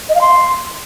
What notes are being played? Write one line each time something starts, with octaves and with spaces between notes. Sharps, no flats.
D#5
F5
C6